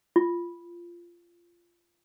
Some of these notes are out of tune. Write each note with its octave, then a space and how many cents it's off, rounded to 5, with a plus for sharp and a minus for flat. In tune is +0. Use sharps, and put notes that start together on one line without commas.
F4 -15